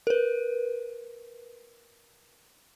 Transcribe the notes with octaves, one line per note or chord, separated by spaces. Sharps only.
A#4 B4